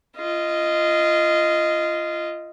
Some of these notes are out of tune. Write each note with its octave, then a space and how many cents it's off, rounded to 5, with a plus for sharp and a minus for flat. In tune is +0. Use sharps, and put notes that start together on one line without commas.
F4 -20 D#5 +0